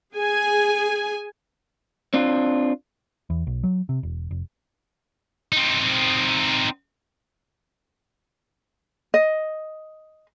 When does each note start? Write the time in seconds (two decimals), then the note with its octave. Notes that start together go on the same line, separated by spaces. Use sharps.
0.16 G#4 G#5
2.14 C4 D4 F4
3.30 E2
3.47 B1
3.64 F#3
3.89 C3
4.03 E1
4.31 F1
5.52 C4 D#4
9.14 D#5